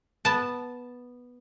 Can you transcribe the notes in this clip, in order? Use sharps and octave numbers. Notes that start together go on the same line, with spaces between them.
B3 A5